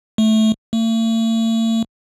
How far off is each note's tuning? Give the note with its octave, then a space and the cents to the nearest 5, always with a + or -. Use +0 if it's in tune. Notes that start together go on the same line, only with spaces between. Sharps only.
A3 -10
A3 +45